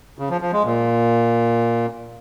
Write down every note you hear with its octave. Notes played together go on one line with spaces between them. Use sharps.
C#3
F3
F3
G#3
A#2